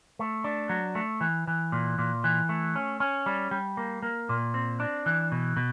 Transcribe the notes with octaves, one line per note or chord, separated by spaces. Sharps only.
A3
D4
F#3
A3
E3
E3
A#2
A#2
E3
A3
C#4
C#4
G3
G3
A#3
A#3
A#2
C4
D4
E3
B2
B2